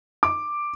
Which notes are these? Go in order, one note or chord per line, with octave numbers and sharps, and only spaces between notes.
D6